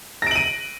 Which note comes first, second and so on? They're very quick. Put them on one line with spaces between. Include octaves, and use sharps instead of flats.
A#6 D7 F#7 D#7